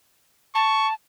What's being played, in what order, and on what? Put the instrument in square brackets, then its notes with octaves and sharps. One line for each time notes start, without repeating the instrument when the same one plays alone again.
[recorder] A5 [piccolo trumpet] C#6